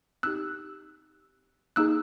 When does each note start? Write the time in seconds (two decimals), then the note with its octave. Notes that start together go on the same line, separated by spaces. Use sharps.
0.23 C4 D#4 G4 E6 F#6
1.76 A#3 D#4 G#4 E6 F#6